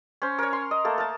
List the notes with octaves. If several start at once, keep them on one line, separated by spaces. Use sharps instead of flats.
C#4 C5
A#4 C#5
C6
D#5
A3 A#3 A4
A#4 A5